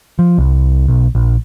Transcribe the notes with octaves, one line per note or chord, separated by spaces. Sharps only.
F3
C2
B1
A#1